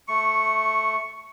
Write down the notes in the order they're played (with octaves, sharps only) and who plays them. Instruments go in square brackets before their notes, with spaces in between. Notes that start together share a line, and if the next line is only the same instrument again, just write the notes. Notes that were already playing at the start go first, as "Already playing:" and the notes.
[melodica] A3 [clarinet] C#6